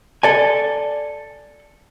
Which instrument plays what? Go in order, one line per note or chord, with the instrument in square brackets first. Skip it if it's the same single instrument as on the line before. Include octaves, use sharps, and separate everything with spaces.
[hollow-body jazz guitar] A4 D5 G#5